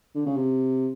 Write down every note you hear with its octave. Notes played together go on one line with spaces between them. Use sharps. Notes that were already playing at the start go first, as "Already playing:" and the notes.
D3
C#3
C3